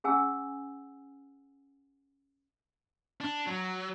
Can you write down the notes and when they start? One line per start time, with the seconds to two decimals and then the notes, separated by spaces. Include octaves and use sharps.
0.04 C#4 G#4 F#5 G#5 E6
3.21 D4
3.46 F#3